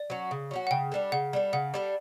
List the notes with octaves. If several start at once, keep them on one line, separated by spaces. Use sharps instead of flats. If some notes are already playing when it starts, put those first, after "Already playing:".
Already playing: D5
F#3 C#4 F#4
C#3
F#3 C#4 F#4
F#5
C#3 G5
G3 D4 A4
C#3 F#5
G3 D4 A4
C#3 F#5
G3 D4 A4